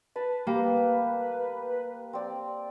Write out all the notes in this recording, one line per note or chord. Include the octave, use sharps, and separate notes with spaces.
B4 A5
A#3 G4
C4 D5